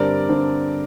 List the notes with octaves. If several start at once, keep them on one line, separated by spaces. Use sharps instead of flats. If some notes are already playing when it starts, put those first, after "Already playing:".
Already playing: G2 D3 G3 C4 A#4 D5
G2 D3 G3 C4